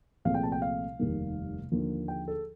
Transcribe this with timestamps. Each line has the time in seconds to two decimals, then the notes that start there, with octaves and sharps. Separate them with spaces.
0.25 C2 A#2 F3 A3 C4 F5
0.34 G5
0.43 A5
0.52 G5
0.62 F5
0.99 F1 D#2 D#3 G3 A#3
1.72 D#2 D3 F3 A#3
2.08 G5
2.28 A4